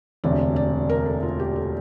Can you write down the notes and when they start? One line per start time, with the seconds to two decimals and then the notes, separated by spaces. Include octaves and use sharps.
0.24 E1 D2 C3 D5
0.56 D5
0.90 A#4
1.06 A4
1.23 F4
1.40 G4
1.56 A4